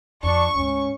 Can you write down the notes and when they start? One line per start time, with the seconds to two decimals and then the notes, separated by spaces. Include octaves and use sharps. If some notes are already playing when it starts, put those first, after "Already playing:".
0.23 F2 D4 C#6
0.55 D2 G#2 C#4